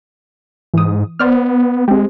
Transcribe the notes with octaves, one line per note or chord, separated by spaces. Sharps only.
G#2 E3 D#6
B3 C5 D5 F6
G#3 C4 G4